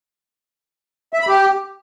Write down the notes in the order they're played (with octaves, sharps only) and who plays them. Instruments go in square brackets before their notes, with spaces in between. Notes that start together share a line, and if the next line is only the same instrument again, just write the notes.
[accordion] E5
B5
G4